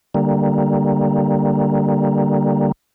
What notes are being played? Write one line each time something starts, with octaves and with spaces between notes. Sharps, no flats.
D3 G3 A#3